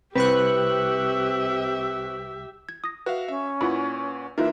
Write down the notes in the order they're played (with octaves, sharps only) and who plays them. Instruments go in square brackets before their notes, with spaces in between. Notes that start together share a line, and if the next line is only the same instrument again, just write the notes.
[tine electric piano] C2 [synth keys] C4 C#6 F#6 [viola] G4 E5 [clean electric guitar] B4
[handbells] G#6
D#6 A#6
[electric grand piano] F#4 E5 F5 [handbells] B4
[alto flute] C#4 [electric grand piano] E5
[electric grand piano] A#2 B4 F#5 [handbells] E4 F4 B5
[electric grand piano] E3 A#3 A#4 [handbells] D#4 F4 B4 [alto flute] E5